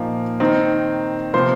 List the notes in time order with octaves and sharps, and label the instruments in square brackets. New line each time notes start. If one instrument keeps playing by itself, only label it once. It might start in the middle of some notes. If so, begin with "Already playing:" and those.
Already playing: [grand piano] A#2 F3 A#3 D#4
D#3 C4 D#4
C3 F3 A#3 C5 C6